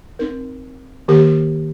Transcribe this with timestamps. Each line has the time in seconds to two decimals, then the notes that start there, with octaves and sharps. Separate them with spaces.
0.19 C4 D#4 A#4
1.08 D#3 A#3 G4 A#4